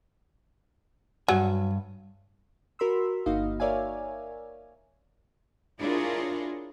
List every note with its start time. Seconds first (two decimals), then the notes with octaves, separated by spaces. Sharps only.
1.28 G2 F#3 G#5
2.79 F#4 A#4 B5 C6 E6
3.26 G1 A#3 D#4 F#4 D#5 F5
3.60 A#4 C#5 D5 E5 F5 G#5
5.79 D4 E4 F4 G#4 A#4 C#5